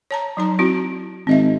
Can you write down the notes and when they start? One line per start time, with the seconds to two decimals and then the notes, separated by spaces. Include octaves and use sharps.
0.11 C#5 A5 A#5
0.37 F#3 D#4 A#5
0.59 C4 E4 F#4
1.27 G#1 C4 D#5 E5